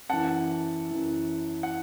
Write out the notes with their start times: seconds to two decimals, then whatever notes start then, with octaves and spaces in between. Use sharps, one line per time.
0.09 F#2 E3 F#5 A5
0.91 F#2 E3
1.63 F#5